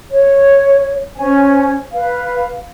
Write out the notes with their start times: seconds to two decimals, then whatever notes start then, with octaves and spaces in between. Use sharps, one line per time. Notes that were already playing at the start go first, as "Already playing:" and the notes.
0.10 C#5
1.16 C#4 C5 G#5
1.93 B4 F5